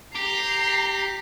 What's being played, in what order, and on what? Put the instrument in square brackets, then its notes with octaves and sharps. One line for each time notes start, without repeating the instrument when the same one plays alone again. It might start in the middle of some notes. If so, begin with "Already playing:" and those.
[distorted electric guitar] G4 [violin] A#5 C7